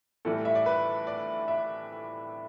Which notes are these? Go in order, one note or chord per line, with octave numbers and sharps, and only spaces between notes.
A2 E3 G3 A4
E5
D5
B4
D5
E5